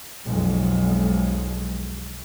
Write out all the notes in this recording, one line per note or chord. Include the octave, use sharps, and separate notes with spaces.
B1 F2 G#3